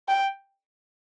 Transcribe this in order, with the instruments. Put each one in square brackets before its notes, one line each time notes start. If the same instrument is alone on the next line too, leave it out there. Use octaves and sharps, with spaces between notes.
[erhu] G5